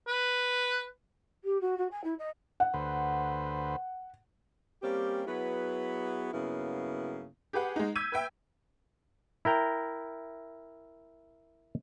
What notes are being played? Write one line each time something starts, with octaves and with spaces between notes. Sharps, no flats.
B4
G4
F#4
F#4
G#5
E4
D#5
F#5
D2 B4 C5
G3 A#3 C4 C#4 G4
F#3 B3 E4 F#4 G#4 B4
G2 C#3 F#3 A#3 B3 E4
G4 G#4 B4 F#5
G#3 D#4
E6 G6 G#6 B6 D#7
B4 E5 G5
E4 A#4 G5 A#5